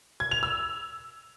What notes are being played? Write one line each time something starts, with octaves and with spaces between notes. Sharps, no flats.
G#6
F7
E6